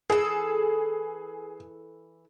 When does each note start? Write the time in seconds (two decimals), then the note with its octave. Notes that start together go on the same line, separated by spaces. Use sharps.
0.10 E3 G#4 A4